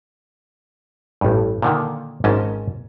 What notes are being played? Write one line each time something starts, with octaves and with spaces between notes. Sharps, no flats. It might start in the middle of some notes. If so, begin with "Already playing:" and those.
A1 G2
A#2 D3 D#3
G#1 G#2 C#4 D#5 A5